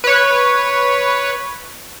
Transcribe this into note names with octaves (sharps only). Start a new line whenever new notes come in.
B4 C#5